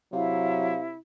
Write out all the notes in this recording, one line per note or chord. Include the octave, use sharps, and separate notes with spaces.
C3 F#3 E4 F5